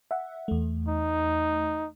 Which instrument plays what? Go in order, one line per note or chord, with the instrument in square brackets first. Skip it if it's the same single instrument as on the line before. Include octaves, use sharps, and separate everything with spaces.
[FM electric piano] E5 F#5
E2 A3
[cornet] D#4